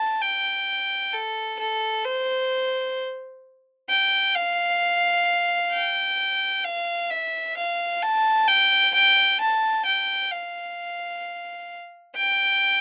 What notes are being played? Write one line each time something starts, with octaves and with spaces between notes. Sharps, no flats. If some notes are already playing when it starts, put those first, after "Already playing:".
Already playing: A5
G5
A4
A4
C5
G5
F5
G5
F5
E5
F5
A5
G5
G5
A5
G5
F5
G5